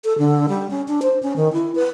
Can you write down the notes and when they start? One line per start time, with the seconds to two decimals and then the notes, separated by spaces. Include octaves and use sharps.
0.05 A4
0.18 D3
0.49 G3
0.70 C#4
0.88 D4
1.02 C5
1.23 C#4
1.36 D#3
1.53 E4
1.75 B4